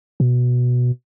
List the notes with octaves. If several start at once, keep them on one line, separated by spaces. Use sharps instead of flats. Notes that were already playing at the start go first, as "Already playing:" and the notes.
B2